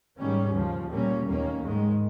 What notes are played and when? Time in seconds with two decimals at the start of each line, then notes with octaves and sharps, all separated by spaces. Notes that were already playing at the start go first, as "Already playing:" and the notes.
0.18 G#2 D#3 G3 C#4
0.54 D#2 C#3 F3
0.90 A#2 G3 A#3 C#4
1.26 D#2 D#3 A#3 C#4
1.62 G#2 D#3 G#3